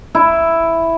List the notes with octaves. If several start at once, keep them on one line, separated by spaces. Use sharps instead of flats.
E4